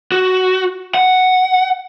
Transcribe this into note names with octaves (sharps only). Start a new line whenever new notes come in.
F#4
F#5